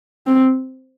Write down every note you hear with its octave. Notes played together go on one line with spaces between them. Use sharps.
C4